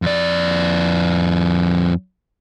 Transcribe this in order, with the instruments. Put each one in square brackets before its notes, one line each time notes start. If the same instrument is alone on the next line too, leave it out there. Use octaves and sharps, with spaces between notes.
[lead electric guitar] F2 D5